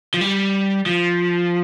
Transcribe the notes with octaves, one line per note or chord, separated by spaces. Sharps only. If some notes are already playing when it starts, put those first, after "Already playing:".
F3
G3
F3